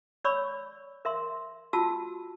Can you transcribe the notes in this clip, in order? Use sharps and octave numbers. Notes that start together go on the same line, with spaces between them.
C#5 D5 B5 C#6 E6
A#4 E5 C6
F4 F#4 A5 E6